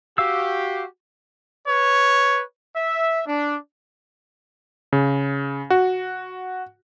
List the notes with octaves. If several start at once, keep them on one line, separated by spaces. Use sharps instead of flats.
F#4 G4 F5 E6
B4 C#5
E5
D4
C#3
F#4